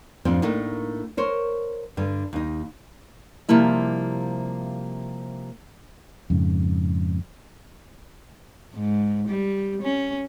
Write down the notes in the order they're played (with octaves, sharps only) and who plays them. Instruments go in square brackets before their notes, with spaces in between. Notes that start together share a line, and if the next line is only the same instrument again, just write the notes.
[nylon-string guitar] F2 G#2 F3 C4 D4
A2 A3 A#3 D4 D#4
A#4 C5 C#5
G2 D3
D#2 D#4
C3 F3 G3 A#3 E4
[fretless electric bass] F2 G#2 C#3
[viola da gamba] G#2
G3
C#4